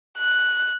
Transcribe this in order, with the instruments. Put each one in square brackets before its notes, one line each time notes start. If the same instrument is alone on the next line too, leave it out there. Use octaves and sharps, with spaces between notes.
[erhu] F#6